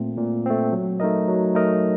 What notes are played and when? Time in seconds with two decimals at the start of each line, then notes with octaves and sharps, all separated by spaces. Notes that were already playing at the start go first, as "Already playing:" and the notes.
Already playing: A#2 A3 C4
0.17 A#2
0.46 A3 C4
0.72 F#3
1.00 A3 D#4 A#4 D#5
1.28 F#3
1.55 A3 D#4 A#4 D#5